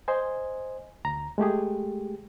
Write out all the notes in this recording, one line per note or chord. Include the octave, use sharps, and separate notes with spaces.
C5 D#5 G#5
D2 A#5
G#3 A3 G4 G#4